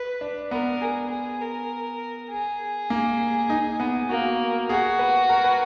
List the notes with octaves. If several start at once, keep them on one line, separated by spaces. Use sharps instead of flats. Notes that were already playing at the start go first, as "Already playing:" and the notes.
Already playing: B4
D4
B3 A#4
G#4
G#4
A#4
G#4
A#3
D#4
B3
A#3 F#4
F#4 G#4
B4
A#4
B4